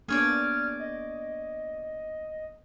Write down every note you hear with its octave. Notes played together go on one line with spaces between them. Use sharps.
A#3 B3 D4 G#4 C#5 D5 F6
D#5